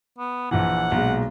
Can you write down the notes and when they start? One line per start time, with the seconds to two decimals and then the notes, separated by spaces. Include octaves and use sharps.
0.18 B3
0.51 A#1 A#2 E3 F#5
0.92 B1 A#2 G#3